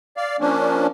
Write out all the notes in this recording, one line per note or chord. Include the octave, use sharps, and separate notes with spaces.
D5 F5
F3 A#3 C#4 D4